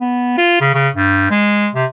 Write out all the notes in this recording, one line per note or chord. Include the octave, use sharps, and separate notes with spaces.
B3
F4
C#3
C#3
G2
G#3
C3